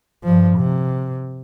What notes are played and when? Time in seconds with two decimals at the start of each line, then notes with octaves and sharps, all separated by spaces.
0.24 G2 F3
0.58 C3